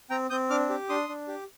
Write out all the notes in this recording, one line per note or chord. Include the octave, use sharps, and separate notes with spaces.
C4 G5 A#5
C4 D#6 G6
D4 D6 F6
G4
D4 C6 D#6
D4
G4